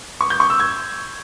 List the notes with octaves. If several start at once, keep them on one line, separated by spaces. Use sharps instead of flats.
C#6
G6
C#6
E6
G#6